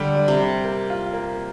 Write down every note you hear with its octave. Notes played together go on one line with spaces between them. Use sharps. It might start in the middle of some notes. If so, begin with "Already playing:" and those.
Already playing: D3 G3
G3
C3
G3
A#3
F4
A#3